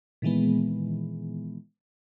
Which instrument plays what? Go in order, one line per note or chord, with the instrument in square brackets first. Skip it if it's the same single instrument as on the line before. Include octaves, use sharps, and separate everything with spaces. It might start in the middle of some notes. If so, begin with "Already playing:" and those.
[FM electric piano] A#2 D#3 E3 G#3 B3